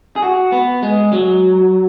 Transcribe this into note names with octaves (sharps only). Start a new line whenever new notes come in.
G#4
F#4
B3
G#3
F#3